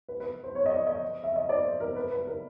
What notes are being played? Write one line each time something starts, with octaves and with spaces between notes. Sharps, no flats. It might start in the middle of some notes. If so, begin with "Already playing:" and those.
B4
B4
C5
C#5
D#5
D5
D#5
E5
D#5
D5
C5
A#4
B4
B4
A#4